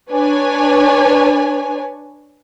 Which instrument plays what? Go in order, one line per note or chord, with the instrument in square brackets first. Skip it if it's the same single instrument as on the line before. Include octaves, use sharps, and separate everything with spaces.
[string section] D4 B4 C#5 G#5